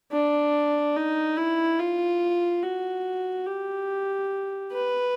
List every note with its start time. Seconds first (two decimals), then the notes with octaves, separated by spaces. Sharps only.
0.12 D4
0.96 D#4
1.37 E4
1.79 F4
2.63 F#4
3.46 G4
4.72 B4